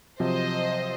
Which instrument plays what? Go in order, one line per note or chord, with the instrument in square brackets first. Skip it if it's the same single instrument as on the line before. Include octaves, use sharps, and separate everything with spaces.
[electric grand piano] C3 F3 F#3 [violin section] C5 D#5